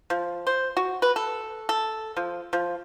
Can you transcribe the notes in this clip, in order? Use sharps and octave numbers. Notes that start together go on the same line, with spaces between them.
F3
C5
F#4
B4
A4
A4
F3
F3